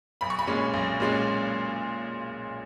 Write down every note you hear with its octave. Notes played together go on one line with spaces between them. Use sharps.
B1 B5
C#6
B5
A#2 G#3 C#4
B1
A#2 G#3 C#4